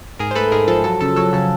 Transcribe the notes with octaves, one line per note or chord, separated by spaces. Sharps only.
G#2 G#4 A#4
C5
A3 A4 B4
G#2 G#4 A#4
F3 A4
F#3 A4
C#3 A4
F#3 A4
C#3 A4